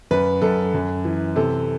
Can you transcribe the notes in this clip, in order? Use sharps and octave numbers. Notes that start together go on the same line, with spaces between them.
F#2 B4
F#2 A4
F#2
E3
C3 A4